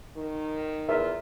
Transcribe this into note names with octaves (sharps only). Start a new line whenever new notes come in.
D#3
E2 F4 G#4 A#4 E5 A#5